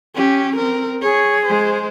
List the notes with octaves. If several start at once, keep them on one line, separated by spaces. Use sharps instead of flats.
C#4 G4
C4 A#4
G#4 C#5
G#3 C5